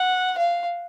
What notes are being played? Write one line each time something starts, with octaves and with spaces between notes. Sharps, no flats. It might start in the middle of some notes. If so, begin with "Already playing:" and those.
Already playing: F#5
F5